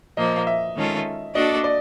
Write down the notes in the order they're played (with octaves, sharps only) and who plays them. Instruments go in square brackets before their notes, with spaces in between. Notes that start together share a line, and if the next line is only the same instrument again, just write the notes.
[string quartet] A#2 F3 A#3 [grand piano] D#5
[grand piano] E5
[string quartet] D#3 G#3 C#4 F4 A4
[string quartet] A#3 D4 F#4 A4 D5 [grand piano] D#5
[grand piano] D5